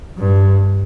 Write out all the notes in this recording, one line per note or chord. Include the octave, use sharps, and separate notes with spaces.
G2